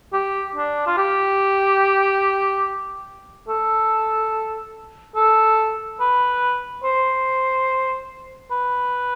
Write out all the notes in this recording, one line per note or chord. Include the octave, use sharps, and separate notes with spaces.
G4
D4
F4
G4
A4
A4
B4
C5
B4